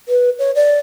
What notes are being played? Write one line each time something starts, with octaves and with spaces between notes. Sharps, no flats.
B4
C#5
D5